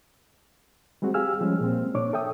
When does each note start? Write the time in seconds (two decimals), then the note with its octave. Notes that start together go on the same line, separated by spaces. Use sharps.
1.02 G3 G#3 C4 F#4
1.14 G4 G#4 F5 G#5 E6 F6
1.41 F3 G3 G#3 C#4
1.60 A#2 C4
1.94 A#2 D4 C#5 D6
2.13 A4 E5 G5 D#6